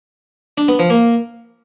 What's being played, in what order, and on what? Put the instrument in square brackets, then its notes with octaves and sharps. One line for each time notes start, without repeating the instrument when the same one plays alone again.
[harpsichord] D4
B3
F3
A#3